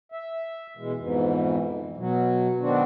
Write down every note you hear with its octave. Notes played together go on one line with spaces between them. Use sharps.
E5
B2 E3 G#3
F2 G#2 B2 E3
B2 F#3
B2 D#3 C4 D4 F#4